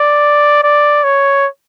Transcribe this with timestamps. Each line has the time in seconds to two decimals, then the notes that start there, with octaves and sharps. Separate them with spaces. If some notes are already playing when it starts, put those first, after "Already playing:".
Already playing: D5
0.63 D5
1.04 C#5